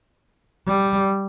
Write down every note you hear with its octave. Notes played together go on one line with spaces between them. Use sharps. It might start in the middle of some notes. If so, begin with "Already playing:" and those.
G3